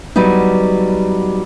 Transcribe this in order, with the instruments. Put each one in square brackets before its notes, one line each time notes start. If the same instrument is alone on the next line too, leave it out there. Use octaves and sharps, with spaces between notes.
[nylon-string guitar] F#3 G3 B3 D#4